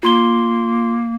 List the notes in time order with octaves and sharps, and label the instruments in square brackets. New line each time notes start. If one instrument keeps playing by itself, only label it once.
[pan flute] A#3 [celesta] F4 C6 G7